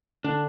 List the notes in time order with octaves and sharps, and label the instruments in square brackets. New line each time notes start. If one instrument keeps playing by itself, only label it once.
[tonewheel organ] D3 [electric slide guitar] D4